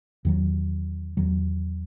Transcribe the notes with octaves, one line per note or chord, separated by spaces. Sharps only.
E2 D#3 F#3
E2 D#3 F#3